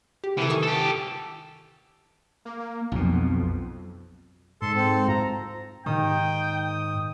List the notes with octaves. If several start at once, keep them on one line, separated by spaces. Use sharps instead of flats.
G4
C3 E3 A4
D#3 C#6 D#6
G4 A4
A#3
B1 F2 B2
G#2 A4 C6
C4
F4 A#5
G#2 D#3 G5 D#6